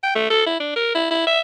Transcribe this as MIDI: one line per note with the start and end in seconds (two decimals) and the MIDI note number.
0.03 0.15 79
0.15 0.27 57
0.30 0.44 69
0.46 0.56 64
0.60 0.76 62
0.76 0.92 70
0.95 1.07 64
1.11 1.24 64
1.27 1.40 76